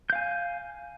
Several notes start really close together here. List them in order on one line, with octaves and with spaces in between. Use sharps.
G6 F5 G#5